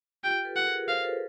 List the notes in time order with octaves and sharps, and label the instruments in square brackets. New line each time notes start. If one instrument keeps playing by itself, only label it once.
[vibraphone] F4 G4 [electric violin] G5
[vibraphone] A4 B4
[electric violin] F#5
[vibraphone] G#4 A#4
[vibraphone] A#4 C5 [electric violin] F5
[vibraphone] A4 B4